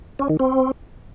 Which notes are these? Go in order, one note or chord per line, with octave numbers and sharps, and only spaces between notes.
C#4
D#3
C4